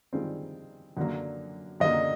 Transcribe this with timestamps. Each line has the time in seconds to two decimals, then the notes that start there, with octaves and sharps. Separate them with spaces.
0.13 G2 D#3 G#3 C4 F4
0.97 F#2 D3 F#3 A#3
1.80 F#2 D3 F#3 A#3 D#5